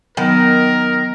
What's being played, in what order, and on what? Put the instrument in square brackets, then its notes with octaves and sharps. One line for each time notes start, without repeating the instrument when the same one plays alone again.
[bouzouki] D#3 [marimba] F#3 B3 [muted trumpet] A#4